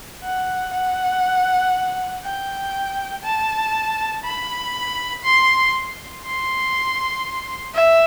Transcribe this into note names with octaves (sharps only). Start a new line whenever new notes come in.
F#5
F#5
G5
A5
B5
C6
C6
E5